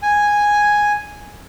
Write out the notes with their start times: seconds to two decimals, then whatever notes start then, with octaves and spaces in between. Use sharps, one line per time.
0.03 G#5